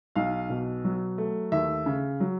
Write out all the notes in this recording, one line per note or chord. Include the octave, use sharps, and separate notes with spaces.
B1 F5
B2
F#3
A3
D#2 E5
C#3
F#3